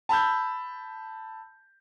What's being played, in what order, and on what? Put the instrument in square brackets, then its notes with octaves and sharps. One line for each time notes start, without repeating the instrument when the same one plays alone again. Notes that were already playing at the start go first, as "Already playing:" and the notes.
[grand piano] A5 B5 E6 G6